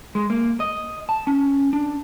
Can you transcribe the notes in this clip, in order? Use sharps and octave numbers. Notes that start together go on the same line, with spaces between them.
G#3
A#3
D#5
A5
C#4
D4